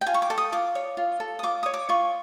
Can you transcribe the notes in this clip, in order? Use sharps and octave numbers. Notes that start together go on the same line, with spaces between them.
G5
F4 G#5
C#6
D6
A4
D#6
F4 D6
C#5
F4
A4
D#6
F4 D6
C#5 D#6
D6
F4 C#6